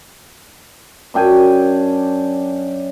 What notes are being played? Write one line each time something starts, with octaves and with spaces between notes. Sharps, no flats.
F#2 D4 G5 G#5